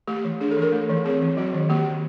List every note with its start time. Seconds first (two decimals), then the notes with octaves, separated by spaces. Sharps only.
0.08 A3 G4
0.24 E3
0.41 D4 G#4
0.51 A4
0.57 E3
0.62 A#4
0.72 A3
0.89 E3
1.05 C4 G#4
1.22 E3
1.37 F#3 F#4
1.53 D#3
1.69 A#3 G4
1.86 D#3